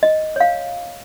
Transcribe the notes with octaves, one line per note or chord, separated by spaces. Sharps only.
D#5
C#5 F5